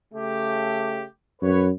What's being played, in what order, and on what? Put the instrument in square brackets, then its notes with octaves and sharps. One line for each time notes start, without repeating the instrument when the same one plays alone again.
[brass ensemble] C#3 A3 G4
[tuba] F#2 [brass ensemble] B4 C#5